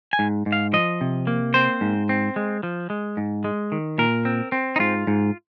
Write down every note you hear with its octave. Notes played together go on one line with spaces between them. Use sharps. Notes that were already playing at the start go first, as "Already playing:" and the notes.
G#5
G#2
G#2
F5
F3 D#5
C3
A#3
C4 C5
G#2
C4
G#3
F3
G#3
G#2
G#3
D#3
A#2 A#4
C4
C4
D#4
G#2 F4
G#2